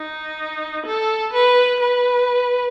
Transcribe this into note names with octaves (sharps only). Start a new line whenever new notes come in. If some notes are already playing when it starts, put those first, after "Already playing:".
Already playing: D#4
A4
B4
B4